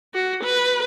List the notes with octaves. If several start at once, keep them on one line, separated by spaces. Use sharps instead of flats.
F#4
B4